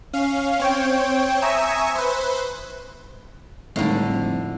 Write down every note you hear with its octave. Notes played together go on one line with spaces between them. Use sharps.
C#4 F5
C4 C#5 G5
E5 G#5 A#5 C#6 D#6 E6
B4 C5
G#1 A2 D3 G3 A3 D#4
F2